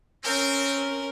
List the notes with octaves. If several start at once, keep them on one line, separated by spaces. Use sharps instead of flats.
C4 C#4 A#4